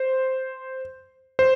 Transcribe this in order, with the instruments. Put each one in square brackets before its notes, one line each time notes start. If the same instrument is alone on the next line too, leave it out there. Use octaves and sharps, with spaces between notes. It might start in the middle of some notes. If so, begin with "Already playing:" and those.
Already playing: [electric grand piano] C5
C5